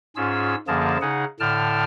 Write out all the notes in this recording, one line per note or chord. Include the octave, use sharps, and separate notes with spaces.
G#2 C#4 F4 G#4 E6
F#2 D3 F3 A#3 G#4 A5
C#3 D#4 G#4 F#5
A2 D3 G5 A5 F6